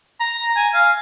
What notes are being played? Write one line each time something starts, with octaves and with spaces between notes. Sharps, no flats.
A#5
G#5
F5